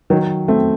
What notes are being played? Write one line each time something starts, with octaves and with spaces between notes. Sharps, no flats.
D#3 F#3
A3 C4